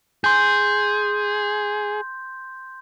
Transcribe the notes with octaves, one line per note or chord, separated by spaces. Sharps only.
G#4 C6 G6